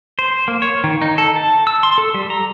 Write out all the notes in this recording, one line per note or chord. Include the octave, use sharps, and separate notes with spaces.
C5
A#3
C#5
D#3
D#4
A4
A5
E6
C6
A4
G3
A#5